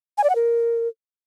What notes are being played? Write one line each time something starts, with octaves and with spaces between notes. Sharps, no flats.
G#5
D5
F#5
A#4